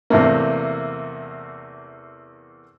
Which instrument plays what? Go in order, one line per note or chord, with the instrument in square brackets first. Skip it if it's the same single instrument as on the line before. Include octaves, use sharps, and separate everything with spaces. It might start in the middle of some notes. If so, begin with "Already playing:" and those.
[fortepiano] E2 C3 A3 A#3